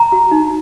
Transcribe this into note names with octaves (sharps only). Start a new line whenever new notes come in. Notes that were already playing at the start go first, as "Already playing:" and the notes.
Already playing: A#5
F#4
D#4